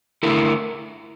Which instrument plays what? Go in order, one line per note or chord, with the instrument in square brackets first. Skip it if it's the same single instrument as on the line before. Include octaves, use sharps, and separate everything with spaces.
[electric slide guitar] D3 A3 E4 A#4